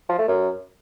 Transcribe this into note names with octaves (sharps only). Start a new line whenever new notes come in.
F3
A3
F#2